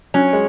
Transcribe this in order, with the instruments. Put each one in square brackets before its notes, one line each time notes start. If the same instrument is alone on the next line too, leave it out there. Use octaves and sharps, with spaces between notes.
[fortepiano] F#3 [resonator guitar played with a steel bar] C#4
[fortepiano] G#3